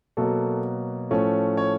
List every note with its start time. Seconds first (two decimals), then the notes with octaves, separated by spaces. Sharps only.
0.17 B2 F#3 A#3 A4
1.11 A2 F3 A3 C#4
1.57 C#5